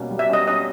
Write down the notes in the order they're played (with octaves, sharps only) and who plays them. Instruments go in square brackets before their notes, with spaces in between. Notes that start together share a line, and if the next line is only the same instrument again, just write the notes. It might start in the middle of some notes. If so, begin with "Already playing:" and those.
Already playing: [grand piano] B2 G3 A#3 C#4
G3
[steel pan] E5
[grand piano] C#4 [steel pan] D#5
[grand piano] C#4 [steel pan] D#5